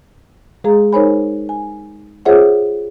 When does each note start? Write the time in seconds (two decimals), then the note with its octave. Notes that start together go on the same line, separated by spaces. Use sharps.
0.64 G#3 G#4 F5 A#5
0.93 D#4 A#4 C5 C#5 G#5 B5
1.49 G#5
2.25 F4 G#4 C5 C#5 E5 F#5